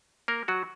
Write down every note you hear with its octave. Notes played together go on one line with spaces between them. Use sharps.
A#3 A#4
F#3 F#4